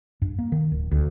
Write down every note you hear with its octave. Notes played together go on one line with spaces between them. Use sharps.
G2
A#3
D#3
D1
D2